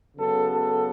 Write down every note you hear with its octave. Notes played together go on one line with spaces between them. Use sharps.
C#3 F#3 B3 A4
A4